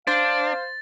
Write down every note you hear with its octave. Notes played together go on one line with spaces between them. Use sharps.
D4 C5 F5 A6